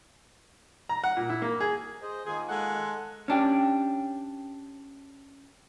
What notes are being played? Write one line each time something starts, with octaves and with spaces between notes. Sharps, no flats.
A#5
F#5
A#2
E4
A#3
G#4
G#4 C5 D#5
D#3 A#3 F4 G#4
G#3 A4 F#5
C#4 D4 G4